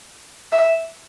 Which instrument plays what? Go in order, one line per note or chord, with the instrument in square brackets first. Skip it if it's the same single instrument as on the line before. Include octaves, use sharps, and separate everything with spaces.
[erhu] E5